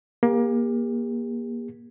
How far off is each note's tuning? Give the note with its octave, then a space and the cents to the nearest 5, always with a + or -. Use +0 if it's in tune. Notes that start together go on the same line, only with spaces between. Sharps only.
A#3 +25 G4 +45